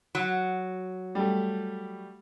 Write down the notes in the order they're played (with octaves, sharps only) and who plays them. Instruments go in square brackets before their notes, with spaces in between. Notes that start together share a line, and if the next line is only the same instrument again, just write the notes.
[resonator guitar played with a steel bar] F#3
[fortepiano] G3 A3